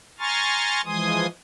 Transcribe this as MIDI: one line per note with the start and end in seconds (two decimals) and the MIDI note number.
0.19 0.81 80
0.19 0.81 82
0.19 0.81 84
0.19 0.81 85
0.19 0.81 89
0.19 0.81 93
0.85 1.27 52
0.85 1.27 53
0.85 1.27 56
0.85 1.27 80
0.85 1.27 84
0.85 1.27 87